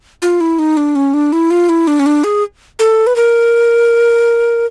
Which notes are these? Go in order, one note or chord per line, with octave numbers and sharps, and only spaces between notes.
F4
E4
D#4
D4
C#4
D4
E4
F4
E4
D4
C#4
D4
G#4
A4
B4
A#4